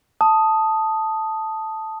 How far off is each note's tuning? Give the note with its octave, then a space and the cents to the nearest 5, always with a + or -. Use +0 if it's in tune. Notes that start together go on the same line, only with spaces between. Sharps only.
A5 +0 D#6 +0